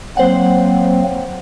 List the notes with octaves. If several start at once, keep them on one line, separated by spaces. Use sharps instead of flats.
F#3 A#3 C4 C5 F#5